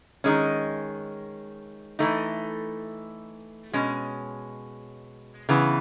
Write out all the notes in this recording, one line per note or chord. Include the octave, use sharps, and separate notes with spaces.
D#3 G#3 C#4
E3 A3 D#4
B2 G#3 C#4
C#3 E3 B3